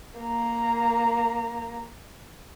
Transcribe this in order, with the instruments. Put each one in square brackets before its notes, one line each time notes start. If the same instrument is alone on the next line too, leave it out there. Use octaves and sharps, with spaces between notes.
[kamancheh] A#3 A#5